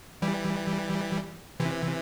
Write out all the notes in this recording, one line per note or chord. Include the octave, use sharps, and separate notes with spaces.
E3 G3
C3 E3